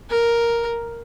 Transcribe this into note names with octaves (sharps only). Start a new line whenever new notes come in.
A#4